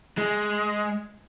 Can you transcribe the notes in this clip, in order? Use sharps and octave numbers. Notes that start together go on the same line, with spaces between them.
G#3